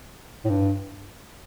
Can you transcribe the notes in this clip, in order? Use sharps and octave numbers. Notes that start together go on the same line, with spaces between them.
A2
G2